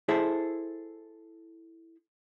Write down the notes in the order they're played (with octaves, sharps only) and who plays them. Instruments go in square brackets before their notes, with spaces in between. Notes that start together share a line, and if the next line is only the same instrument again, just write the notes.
[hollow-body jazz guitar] E4 G#4 A4 C5 E5